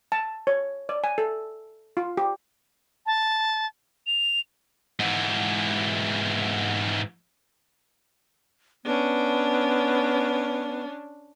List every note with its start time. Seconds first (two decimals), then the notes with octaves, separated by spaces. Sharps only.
0.12 A5
0.47 C#5
0.89 D5
1.04 G#5
1.18 A4
1.97 F4
2.17 G4
3.06 A5
4.06 F7
4.99 G#2 E3
8.84 B3 C#4 D4